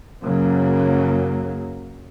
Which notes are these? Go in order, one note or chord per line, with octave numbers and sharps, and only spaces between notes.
F#2 C#3 F#3 A#3